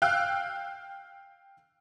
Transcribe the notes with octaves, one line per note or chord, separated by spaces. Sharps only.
F5 G5 E6 F#6